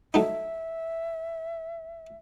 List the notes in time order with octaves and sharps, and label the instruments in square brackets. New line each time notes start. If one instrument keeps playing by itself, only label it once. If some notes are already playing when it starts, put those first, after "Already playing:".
[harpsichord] F#3 A3 D#4 [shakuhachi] E5